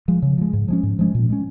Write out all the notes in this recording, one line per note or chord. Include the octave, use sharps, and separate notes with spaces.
F3 G#3
C#3
F3 G#3
G#2
F3 G#3 C#4
G#2
F3 G#3 C#4
A#2
G#3 C#4